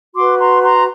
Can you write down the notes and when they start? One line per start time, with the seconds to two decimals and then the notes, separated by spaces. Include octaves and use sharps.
0.15 F#4 B4 C6 D6
0.39 A#5 C6
0.62 A#5 C6